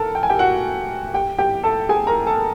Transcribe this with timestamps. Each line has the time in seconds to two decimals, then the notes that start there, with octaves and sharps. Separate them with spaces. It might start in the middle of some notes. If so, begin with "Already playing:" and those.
Already playing: A4 A#4 A5
0.15 G5
0.23 G#5
0.30 G4 G5
0.39 F#4 F#5
1.14 G4 G5
1.39 G4 G5
1.63 A4 A5
1.89 G#4 G#5
2.07 A#4 A#5
2.26 A4 A5